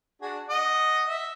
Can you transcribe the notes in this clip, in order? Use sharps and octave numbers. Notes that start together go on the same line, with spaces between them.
D4 F#4 G#4
D#5 F#5
E5